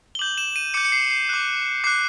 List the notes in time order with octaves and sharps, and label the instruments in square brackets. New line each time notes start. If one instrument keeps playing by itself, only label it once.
[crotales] G7
D6 G6 F#7
E7
D#7
D6 G6 C#7
C#7
C7
C7
D6 F#6
D6 F#6 C7